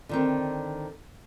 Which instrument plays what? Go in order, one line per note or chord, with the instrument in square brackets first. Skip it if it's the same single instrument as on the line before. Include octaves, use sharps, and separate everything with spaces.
[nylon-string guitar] D3 D#3 C4